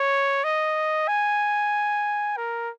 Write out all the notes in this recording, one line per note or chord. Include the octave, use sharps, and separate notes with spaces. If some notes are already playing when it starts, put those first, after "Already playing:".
Already playing: C#5
D#5
G#5
A#4